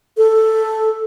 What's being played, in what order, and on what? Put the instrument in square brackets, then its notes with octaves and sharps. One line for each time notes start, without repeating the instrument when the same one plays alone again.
[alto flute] A4